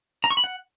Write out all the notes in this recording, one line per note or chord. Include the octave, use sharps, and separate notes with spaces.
A#5
C#6
B5
F#5